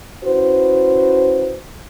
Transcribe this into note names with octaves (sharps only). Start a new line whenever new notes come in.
C#4 E4 F#4 B4 C5